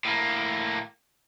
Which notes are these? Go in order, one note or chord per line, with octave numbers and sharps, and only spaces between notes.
A2 A#3